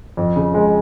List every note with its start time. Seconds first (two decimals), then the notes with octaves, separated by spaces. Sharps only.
0.17 F2
0.36 C#3
0.54 G#3